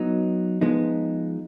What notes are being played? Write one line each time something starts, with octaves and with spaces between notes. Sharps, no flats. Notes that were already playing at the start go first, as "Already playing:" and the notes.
Already playing: F#3 B3 D#4
F3 G#3 B3 D#4